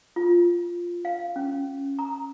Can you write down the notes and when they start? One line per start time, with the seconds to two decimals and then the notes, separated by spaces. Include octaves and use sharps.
0.16 F4
1.05 F5
1.36 C#4
1.99 A#5